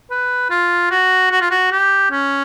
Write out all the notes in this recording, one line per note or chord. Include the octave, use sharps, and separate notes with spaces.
B4
F4
F#4
F#4
F4
F#4
G4
C#4